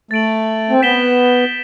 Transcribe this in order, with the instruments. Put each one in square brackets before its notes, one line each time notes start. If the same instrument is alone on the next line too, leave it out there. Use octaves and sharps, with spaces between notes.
[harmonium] A3 [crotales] A6 D7 F#7
[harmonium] C4
[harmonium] B3 [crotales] G6 B6 E7 G7